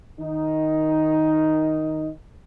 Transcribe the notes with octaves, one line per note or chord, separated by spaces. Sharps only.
D#3 D#4